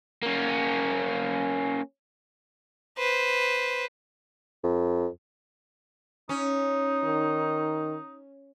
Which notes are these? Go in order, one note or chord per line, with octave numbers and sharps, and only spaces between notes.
A#3 C#4
B4 C5
F2
C#4 D#4
D#3